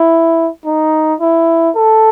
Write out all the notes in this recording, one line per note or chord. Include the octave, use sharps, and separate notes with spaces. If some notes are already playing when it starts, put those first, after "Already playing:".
Already playing: E4
D#4
E4
A4